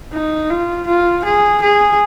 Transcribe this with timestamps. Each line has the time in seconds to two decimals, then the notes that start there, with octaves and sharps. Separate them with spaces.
0.14 D#4
0.50 F4
0.88 F4
1.25 G#4
1.63 G#4